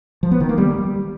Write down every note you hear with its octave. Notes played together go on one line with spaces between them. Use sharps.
F3
B3
D#3
A#3
G3